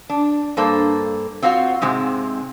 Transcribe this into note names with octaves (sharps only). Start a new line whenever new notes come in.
D4
G2 A#3 A4 C5
C4 F4 F#4 C#5 F5
G#2 C3 G#3 C4